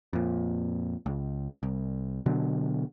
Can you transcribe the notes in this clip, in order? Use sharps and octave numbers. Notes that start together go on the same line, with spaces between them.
F2 A#2
C#2
C2
B2 D3 F#3